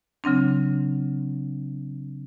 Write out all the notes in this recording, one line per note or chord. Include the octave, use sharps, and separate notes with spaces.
C#3 F#3 C4 D4